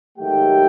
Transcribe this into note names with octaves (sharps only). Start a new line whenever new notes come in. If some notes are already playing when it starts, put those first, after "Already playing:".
G#2 D#3 F#3 A3 G4 G5